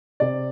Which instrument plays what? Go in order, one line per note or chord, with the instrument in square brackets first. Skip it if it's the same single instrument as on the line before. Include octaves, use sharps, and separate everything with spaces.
[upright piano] C3 D5